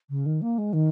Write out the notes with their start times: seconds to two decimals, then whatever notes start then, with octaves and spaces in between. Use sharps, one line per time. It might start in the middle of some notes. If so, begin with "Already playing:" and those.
0.10 C#3
0.26 D#3
0.42 A#3
0.58 G#3
0.73 D#3